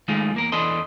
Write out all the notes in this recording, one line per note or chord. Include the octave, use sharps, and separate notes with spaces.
D#3 G#3 A3 F4
E2 A#3 A#4
E2 E3 D4 A4 D#5 C6